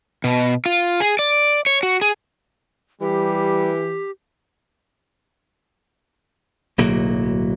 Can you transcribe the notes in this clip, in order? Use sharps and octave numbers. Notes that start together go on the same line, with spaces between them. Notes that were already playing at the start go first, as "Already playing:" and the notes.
B2
F4
G#4
D5
C#5
F#4
G#4
E3 G3 G4
D1 B1 F#3 A#3